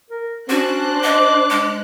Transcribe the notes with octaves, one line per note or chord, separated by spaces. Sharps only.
A#4
C#4 D4 F#4 C5 F#6
D#5 D6
G#3